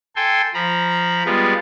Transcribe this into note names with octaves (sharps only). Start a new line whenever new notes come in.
A4 G5 G#5 C6
F3 A#5 B5
G3 G#3 B3 F4